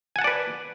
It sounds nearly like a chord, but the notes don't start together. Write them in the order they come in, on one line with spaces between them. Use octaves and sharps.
G#5 F#5 A5 D5 B4